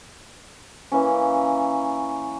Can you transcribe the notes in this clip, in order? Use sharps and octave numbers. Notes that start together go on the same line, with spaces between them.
E3 A#3 C#4